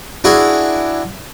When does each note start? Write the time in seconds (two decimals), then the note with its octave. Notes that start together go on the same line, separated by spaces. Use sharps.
0.24 D4 E4 F#4 G#4